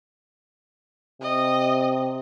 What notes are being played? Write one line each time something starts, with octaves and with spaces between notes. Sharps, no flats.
C3 D#5